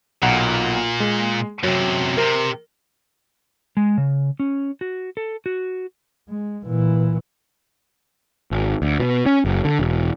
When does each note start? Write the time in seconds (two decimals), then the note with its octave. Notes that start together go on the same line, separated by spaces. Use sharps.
0.22 B1 A#2 F#5 A#5
1.00 G#3 G#4
1.64 F#2 C3 F#3
2.18 C3 A#4
3.77 G#3
3.98 C#3
4.40 C#4
4.81 F#4
5.17 A4
5.46 F#4
6.29 G#3
6.65 A#2 E3
8.51 G#1
8.82 D2
9.00 B2
9.26 C#4
9.45 F#1
9.65 D3
9.79 E1